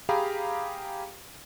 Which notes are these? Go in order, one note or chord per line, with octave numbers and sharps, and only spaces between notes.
G4 G#4 F5 G5 A#5 B5